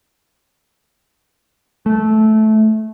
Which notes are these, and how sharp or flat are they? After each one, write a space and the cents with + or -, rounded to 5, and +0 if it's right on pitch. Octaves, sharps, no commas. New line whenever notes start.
A3 -15